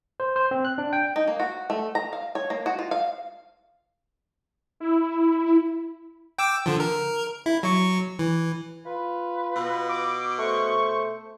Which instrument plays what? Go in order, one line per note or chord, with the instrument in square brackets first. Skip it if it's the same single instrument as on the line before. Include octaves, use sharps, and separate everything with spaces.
[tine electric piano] C5
C5
C4
F#6
D4
G5
[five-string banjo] D#4
A#3
F#4
A3
A#5
F5
C#5
A#3
F#4
F4
F5
[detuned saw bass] E4
[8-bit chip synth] G5 D6 E6
D3 F3
A#4
E4
F#3 C#6
E3
[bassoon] F4 [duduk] B4
[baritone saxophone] B2
[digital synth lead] D6
[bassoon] A3 [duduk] C5 [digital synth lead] C#6